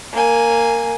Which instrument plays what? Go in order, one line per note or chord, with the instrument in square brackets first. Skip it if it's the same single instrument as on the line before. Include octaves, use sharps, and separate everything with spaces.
[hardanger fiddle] A#3 G#5